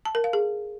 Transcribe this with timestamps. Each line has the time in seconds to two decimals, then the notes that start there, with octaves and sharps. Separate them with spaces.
0.05 A5
0.15 A#4
0.24 F5
0.33 G#4